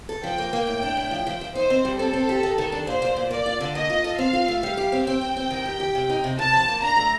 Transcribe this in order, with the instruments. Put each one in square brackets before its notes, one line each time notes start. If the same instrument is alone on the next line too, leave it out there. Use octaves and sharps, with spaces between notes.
[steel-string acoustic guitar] A4
[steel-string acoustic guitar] F3 [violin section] G5
[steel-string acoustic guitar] A#3
A#3
A2
D4
A2
F3
F3
F3
[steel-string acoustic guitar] D#4 [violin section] C5
[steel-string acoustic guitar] C4
G3
[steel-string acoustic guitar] C4 [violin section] A4
[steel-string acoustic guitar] C4
G4
D#3
D#3
D4
[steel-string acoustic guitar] A#2 [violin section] C5
[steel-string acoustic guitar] A#2
A#2
[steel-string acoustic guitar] A#3 [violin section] D5
[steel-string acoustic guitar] F4
D3
[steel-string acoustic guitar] A#3 [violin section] D#5
[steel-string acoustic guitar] F4
A4
[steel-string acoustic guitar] C4 [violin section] F5
[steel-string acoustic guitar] F4
A3
[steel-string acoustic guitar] G3 [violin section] F5
[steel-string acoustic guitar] G4
C4
[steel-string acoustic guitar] C4 [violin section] G5
[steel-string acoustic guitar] C4
C4
D#3
G4
G4
C3
D#4
C3
[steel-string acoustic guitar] C3 [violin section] A5
[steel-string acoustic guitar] F3
A#3
[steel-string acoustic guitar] D4 [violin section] A#5
[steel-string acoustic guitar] A3